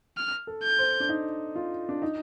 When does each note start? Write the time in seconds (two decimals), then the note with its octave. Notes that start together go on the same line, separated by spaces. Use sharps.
0.17 F6
0.47 A4
0.63 G6
0.79 C5
1.00 D4
1.09 D#4
1.56 F4
1.89 D4
2.02 D#4